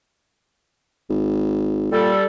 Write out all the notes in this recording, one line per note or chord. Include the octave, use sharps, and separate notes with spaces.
G#1
A#2 G3 A4